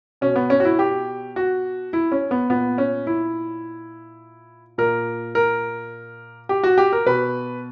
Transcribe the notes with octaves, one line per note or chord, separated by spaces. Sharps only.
B2 C#4
B3
C#4
F#4
E4
G4
F#4
E4
C#4
B3
A#2 B3
C#4
E4
A#2 A#4
A#4
G4
F#4
G4
A#4
B2 B4